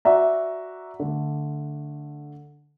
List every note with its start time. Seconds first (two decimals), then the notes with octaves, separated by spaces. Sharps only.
0.05 F#4 D5 E5 A#5
1.00 D3 A3